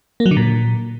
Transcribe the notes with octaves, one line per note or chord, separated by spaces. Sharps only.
A#3
F#3
D3
A#2